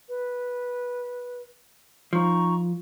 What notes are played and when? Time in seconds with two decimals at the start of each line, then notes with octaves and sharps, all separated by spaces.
0.08 B4
2.13 F3 D#4 A#5 C#6